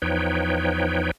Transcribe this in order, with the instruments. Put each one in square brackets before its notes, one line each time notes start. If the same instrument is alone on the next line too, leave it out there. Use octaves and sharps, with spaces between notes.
[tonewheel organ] E2 F3 D#4 B4 C#5 G5